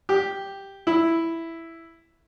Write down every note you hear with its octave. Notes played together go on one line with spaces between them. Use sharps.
G4
E4